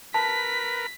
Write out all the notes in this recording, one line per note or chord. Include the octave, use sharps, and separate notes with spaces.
A#4 B4 A5 B6